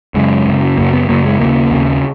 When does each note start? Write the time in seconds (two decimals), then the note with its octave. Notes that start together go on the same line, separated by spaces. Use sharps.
0.14 F#2 C#3 G#3
0.46 F#2 C#3
0.77 F#2 C#3 A#3
0.93 B3
1.09 F#2 C#3 A#3
1.25 G#3
1.40 D#2 C#3 A#3
1.71 D#2 C#3